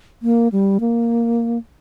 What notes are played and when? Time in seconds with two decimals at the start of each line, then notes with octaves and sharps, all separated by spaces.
0.22 A#3
0.52 G3
0.80 A#3